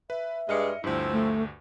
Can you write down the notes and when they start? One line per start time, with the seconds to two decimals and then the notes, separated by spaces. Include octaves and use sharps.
0.10 B4 E5
0.49 G2 G#3 D#5 F6 C#7
0.84 D2 G2 F3 C4 E4
1.12 A3